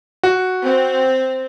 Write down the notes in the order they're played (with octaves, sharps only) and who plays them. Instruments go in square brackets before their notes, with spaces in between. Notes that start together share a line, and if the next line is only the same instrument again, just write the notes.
[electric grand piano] F#4
[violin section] C4